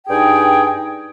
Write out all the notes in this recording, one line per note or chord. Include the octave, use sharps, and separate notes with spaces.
G2 D#4 G#4 G5